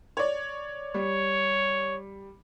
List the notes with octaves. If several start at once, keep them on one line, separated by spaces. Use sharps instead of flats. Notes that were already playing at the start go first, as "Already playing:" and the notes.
C#5 D5
G3 C#5